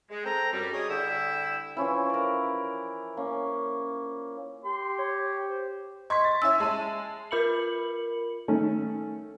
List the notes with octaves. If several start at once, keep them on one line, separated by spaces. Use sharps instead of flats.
G#3
C4 A4 G5 A#5
F#2 G3
G#4 C#5 D#5 G#5 D#6
D3 G3 E4 G5 E6
E3 F3 C#4 E4
A#4 D5
A#3 C#4
G4 C6
C#5
C5
D#5 C6 C#6 G#6 B6
A6
C#4 E4 C#5 E5 E6
G#3 A5 D#7
F4 A#4 B5 C#7 F#7
D#3 A3 C#4